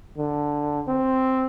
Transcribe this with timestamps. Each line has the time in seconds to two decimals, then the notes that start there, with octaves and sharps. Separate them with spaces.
0.18 D3
0.88 C4